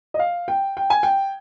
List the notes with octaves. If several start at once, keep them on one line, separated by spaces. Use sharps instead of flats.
D#5
F5
G5
G5
G#5
G5